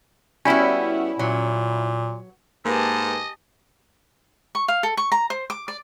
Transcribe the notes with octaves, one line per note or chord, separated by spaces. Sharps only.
G3 B3 C#4 E4 F#4
A#2 F#3
G#2 A#3 G4 G#4 B4 D#5 A5
C#6
F5
A4
C#6
A#5
C5
D6
D5